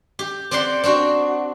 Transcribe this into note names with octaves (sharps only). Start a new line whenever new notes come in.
G4
C4 G4 D5 F#5 C6
C4 D4 F#4